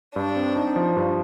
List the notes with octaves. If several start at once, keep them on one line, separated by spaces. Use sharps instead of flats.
G2 D4
C4
D#4
F3
G2